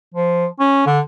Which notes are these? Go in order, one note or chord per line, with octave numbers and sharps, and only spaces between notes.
F3
C#4
D3